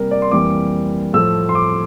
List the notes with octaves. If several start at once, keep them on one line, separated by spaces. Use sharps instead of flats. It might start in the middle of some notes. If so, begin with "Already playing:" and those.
Already playing: C3 G3 A#3 A#4
D5
C6
F2 E3 G3 A#3 D6
A2 F3 A3 E6
C6
D6